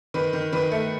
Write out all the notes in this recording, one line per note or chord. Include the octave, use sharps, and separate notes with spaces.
D#3 B4
D#3
D#3 B4
A3